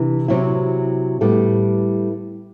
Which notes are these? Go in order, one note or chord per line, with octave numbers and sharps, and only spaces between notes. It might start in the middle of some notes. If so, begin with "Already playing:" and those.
Already playing: C3 E3 D4
C3 F#3 C4 E4
A2 G3 B3 E4 A4